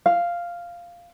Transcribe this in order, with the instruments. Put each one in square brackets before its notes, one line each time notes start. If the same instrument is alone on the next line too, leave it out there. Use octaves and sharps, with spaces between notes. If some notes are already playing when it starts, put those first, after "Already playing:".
[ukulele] F5